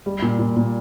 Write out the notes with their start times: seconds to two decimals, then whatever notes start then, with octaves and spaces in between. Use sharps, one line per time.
0.06 G3
0.22 A#2
0.39 A#2
0.56 A#2